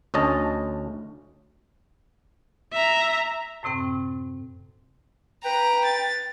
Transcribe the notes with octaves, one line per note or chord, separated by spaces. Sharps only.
D2 C#4 D#5 A5
E5 A#5
F#2 A2 C3 C4 G5
B4 G5 A#5
A6